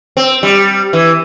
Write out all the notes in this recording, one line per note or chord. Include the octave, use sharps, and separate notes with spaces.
C4
G3
E3